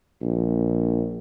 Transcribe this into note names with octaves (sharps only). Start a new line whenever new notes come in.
A#1